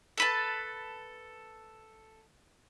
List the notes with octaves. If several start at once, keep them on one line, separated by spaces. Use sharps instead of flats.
A4 B4 A5